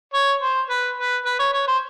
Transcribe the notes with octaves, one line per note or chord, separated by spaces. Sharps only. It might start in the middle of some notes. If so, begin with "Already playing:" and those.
C#5
C5
B4
B4
B4
C#5
C#5
C5